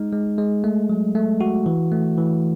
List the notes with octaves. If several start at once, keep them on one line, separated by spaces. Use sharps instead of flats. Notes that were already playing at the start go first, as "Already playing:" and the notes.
Already playing: G#3 D#4
G#3
G#3
A3
F#3
A3
F#4
E3
A3
E3